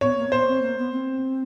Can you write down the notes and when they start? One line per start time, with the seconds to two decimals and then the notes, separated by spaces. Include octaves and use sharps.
0.01 B3 C#5
0.17 A#3
0.28 C4
0.32 B3 C5
0.47 C4
0.62 A#3
0.78 B3
0.92 C4